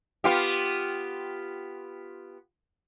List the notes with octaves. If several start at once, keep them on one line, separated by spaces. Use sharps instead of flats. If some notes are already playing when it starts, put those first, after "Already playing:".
B3 F4 G4